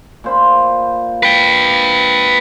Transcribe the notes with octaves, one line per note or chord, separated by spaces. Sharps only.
A#2 C5 B5
B4 G5